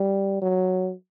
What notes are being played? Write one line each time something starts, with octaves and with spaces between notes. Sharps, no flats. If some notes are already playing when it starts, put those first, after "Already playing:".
Already playing: G3
F#3